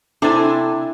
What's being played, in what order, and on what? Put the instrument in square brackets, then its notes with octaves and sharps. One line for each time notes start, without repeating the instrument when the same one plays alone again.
[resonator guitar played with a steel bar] C3 D4 A4 [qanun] C4 E4 G#5